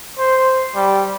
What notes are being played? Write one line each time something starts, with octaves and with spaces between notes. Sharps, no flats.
C5
G3